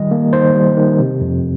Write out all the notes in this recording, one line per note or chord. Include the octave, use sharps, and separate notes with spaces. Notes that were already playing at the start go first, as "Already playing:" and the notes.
Already playing: D#3 G3 D#5
A#3
D#3 C5
G3
D#3
C3
F2